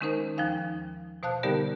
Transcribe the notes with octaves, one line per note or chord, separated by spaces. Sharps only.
D#3 G#3 C#4 D#4 A#4 C5
D#2 F3 D#4 F5 G#5
B2 C5 F5 A5 F#6
D3 G3 B3 D#4 G4 A#4